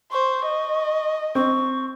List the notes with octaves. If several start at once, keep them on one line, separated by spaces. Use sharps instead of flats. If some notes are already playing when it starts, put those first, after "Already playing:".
C5 C#6
D#5
C4 C#6